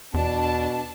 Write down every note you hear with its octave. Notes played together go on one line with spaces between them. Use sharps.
E2 B2 D4 A5